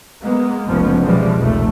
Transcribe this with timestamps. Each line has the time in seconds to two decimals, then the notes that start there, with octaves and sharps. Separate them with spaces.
0.23 G#3 A#3 B3
0.66 F1 C#2 F3 G3 B3 C#4
1.03 B2 E3 F3 G3 G#3
1.37 F1 C2 A#2 A3